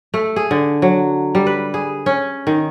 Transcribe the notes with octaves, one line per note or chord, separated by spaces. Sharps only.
A3
G#4
D3
F#3
G3
B4
G#4
C#4
D#3